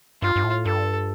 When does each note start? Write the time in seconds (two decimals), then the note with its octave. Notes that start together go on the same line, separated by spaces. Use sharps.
0.22 G2 F4
0.36 G2
0.44 A2
0.65 G2 A4